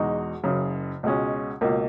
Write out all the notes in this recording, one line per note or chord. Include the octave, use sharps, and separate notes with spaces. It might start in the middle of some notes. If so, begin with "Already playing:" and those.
Already playing: E2 B2 G#3 D#4 F#4
F#1 F#2 C#3
C#2 B2 G#3 C#4
C#2 B2 A#3